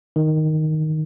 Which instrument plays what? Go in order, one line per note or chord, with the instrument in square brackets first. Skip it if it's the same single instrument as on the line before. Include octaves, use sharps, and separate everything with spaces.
[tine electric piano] D#3